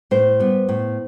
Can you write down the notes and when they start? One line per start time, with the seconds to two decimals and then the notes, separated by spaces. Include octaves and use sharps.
0.11 A2 C5
0.40 G3 B3
0.69 A2